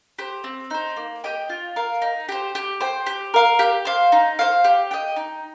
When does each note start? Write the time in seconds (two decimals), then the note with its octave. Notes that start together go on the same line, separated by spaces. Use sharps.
0.19 G4 C5
0.44 C4
0.70 D#4 C5
0.96 A#3
1.24 G4 D#5 G5
1.49 F4
1.76 A#4 F5
2.02 D#4
2.29 G4 C5
2.55 G4
2.81 C5 G5
3.06 G4
3.34 A#4 F5
3.59 G4
3.85 C5 F5
4.12 D#4
4.39 C5 F5
4.64 G4
4.91 D#5 G5
5.16 D#4